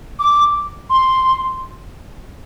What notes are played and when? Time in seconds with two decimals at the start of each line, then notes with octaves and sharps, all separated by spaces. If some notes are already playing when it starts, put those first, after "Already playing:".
0.20 D6
0.90 C6